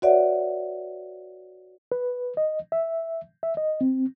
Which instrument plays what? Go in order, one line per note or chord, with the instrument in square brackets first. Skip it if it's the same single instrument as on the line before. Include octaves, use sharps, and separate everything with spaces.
[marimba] F#4 B4 C#5 D5 E5 F#5
[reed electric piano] B4
D#5
E5
E5
D#5
C4